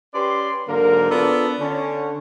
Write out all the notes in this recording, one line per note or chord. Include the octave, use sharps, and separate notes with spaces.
C#4 G4 B4 D5 C6
G#2 D3 F#3 A#3 A#4
B3 D4 F4 A4 A#4 D5
D3 C#4